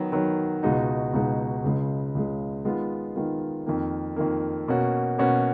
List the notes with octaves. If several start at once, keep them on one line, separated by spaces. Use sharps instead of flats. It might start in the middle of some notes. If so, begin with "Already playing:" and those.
Already playing: D#3 F#3 B3
D#3 F#3 B3
C#2 B2 G#3 D#4 F#4
C#2 B2 G#3 D#4 F#4
C#2 C#3 G#3
C#2 C#3 G#3
D#3 G#3 B3 F4
D#3 G#3 B3 F4
F2 D#3 A#3
F2 D#3 A#3
B2 A#3 C#4 F#4
B2 A#3 C#4 F#4